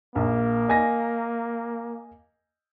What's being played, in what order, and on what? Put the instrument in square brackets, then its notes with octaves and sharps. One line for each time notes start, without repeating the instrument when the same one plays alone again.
[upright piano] A#1 [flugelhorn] A#3
[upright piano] D#5 G#5 A#6